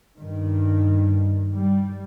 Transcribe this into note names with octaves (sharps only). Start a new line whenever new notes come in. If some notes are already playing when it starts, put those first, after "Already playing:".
G2 D#3
G3